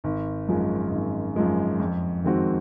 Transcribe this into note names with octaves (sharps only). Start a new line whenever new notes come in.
G#1
F#2 F3 G#3
G#1
F#2 F3 G#3
F2
D#3 G#3 C4 F#4